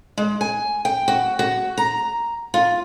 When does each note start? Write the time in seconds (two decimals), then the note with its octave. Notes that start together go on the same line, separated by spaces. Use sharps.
0.17 G#3
0.41 G#5
0.85 G5
1.08 F#4
1.39 F#4
1.77 A#5
2.54 F4